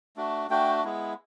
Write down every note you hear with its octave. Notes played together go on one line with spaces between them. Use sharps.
A3 D4 F#4
A3 D4 F#4 G5
G#3 B3 E4